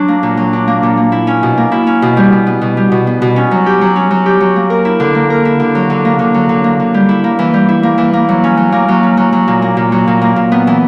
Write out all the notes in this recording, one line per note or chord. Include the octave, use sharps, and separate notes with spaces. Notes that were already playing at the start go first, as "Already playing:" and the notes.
Already playing: F#3 D4
A#3
A#2
F#3
D4
A#3
A#2
A#3
E4
C#4
B2
A#3
E4
C#4
B2
G3
B2
B3
B2
G3
B2
B3
B2
C#4
F#3
G4
F#3
C#4
F#3
G4
F#3
A#3
A#4
E4
D3
A#3
A#4
E4
D3
F#3
D3
A#3
D3
F#3
D3
A#3
D3
G3
E4
A#3
E3
G3
E4
A#3
E3
A#3
F#3
C#4
F#3
A#3
F#3
C#4
F#3
F#3
A#2
A#3
A#2
F#3
A#2
A#3
A#2
B3
E3